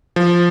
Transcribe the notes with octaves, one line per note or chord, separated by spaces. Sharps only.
F3